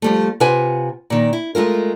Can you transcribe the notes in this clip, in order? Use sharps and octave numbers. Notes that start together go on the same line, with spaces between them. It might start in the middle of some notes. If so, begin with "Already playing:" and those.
F3 G3 A3
C3 F4 B4 F#5 G#5
A#2 D#3
E4
G#3 A3 F4 A#4